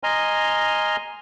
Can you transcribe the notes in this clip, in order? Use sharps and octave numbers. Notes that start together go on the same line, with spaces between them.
D#5 G#5 A#5 C6 F6